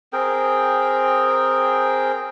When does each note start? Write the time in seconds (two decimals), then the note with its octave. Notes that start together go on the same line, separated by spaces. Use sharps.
0.13 C4 G#4 A#4 G5